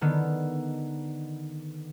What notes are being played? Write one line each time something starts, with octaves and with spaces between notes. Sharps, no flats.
D3 D#3 B3